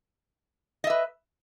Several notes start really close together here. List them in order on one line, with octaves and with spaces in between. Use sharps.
D#5 E5 B4